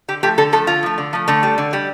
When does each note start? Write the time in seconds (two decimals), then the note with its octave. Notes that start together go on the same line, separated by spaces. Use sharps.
0.08 D3 G4
0.23 F3 A3 G4
0.38 D3 A4
0.52 F3 A3 A4
0.67 D3 F4
0.83 F3 A3
0.98 D3
1.13 F3 A3
1.28 D3 A3
1.43 G3
1.58 D3
1.73 G3